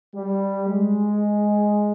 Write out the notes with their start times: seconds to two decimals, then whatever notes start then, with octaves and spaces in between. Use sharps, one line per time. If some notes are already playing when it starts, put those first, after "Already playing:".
0.14 G3
0.68 G#3